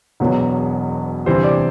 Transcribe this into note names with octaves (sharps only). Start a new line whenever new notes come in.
E1 E2 B2 F#3
D2 C3 E3 G3 C5
D5